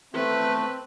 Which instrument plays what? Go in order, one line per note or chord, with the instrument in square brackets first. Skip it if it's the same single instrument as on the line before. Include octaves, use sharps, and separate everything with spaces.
[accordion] A3 [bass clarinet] C4 [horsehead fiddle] B4